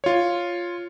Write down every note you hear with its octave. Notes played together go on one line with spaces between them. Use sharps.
F4 C#5